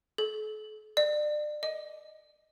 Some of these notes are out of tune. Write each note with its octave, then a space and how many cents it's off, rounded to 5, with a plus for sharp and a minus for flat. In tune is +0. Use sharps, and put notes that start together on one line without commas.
A4 -45
D5 +30
D#5 +10